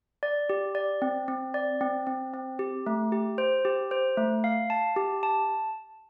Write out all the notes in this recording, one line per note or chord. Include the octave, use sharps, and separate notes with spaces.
D5
G4
D5
C4
C4
D5
C4
C4
C4
G4
A3
G4
C5
G4
C5
A3
F5
A5
G4
A5